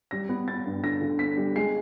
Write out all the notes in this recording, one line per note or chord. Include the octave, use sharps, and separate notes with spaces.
G3 A#6
B3
B3 A6
G2
D3 A#6
D3
B3 B6
G3
G#3 C7